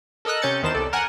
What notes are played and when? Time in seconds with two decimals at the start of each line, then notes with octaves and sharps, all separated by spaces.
0.25 A4 A#4 D#5 E6 F#6
0.42 C3 C#4 G6 A6 C#7
0.63 E2 D#3 C5 A5 E7
0.75 C2 A4 D5
0.93 A#4 F#5 G#5